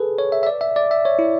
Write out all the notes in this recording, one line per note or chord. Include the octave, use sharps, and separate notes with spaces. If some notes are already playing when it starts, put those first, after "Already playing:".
Already playing: G#4 A4 B4
C#5
E5
E5
D5
E5
D5
E5
C#5
E4